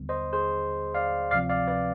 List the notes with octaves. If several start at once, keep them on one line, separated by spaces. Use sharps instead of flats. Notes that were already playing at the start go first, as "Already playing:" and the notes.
Already playing: D#2 D3 G3 B3
C5 D#5
G#4 C5
D5 F5
D2 C3 F3 C4 D5 F5
D5 F5
B4 D5